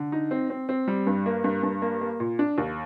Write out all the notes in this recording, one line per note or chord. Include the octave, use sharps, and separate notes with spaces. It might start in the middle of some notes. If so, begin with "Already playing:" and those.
Already playing: D3
D#4
C4
C4
C4
G3
G2
A#3
G2
G2
A#3
A#3
A#2
D4
D#2